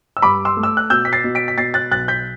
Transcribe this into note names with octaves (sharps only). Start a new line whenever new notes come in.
E6
G2 B5 D6
C6 E6
A3
E6
F#6
B2 E6 G6
B6
A6 C7
B2
B6 D7
B6
B2 A6 C7
F#6 A6
B1 F#6 A6
G6 B6